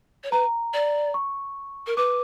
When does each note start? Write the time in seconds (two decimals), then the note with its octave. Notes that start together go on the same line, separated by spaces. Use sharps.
0.24 C#5
0.32 B4 A#5
0.74 D5
1.14 C#6
1.87 A#4
1.97 B4 D6